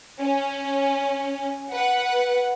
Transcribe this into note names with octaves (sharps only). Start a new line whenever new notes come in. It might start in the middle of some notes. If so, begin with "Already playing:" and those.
C#4
B4 F#5